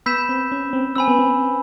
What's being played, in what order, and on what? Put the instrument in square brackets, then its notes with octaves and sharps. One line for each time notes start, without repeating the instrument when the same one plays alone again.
[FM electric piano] B3 [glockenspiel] B5 E6 G6 B6 E7
[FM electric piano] C4
C#4
C4
[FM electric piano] C4 [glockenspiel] G#5 B5 E6
[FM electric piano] B3
C4